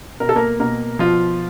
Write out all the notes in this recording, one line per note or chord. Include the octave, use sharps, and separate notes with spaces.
B2 A#4
A4
A#3 A#4
B2 A#3 A#4
B2 F3 F4